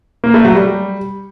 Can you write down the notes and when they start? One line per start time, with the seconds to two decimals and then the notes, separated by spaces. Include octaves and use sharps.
0.24 A#3
0.34 A3
0.45 F#3
0.55 G3